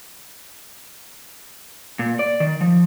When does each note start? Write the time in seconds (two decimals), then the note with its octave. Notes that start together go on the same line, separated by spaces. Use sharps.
1.99 A#2
2.19 D5
2.40 D#3
2.61 F3